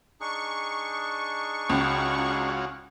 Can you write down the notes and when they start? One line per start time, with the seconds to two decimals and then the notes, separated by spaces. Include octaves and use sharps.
0.20 D4 D#4 G#4 C#6
1.70 C#2 C#4 F4 F#4